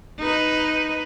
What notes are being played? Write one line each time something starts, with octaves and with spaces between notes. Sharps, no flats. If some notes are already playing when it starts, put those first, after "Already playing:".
D#4 B4